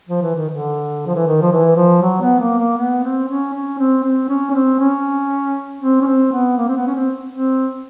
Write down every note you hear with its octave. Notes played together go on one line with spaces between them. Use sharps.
F3
E3
D#3
D3
F3
E3
D#3
F3
E3
F3
F#3
B3
A#3
A#3
B3
C4
C#4
C#4
C4
C4
C#4
C#4
C4
C#4
C4
C#4
C4
B3
A#3
C4
B3
C#4
C4
C4